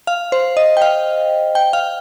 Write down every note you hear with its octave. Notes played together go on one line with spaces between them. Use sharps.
F5
C5
D#5
G5
F5
G5
F5